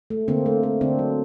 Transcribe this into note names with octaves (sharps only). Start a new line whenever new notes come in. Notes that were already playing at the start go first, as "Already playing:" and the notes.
A3
D3 A#3 C4
A3
A3
D3 C4 D4
F#3